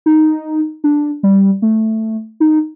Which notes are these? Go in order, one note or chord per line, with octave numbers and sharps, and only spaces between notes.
D#4
D4
G3
A3
D#4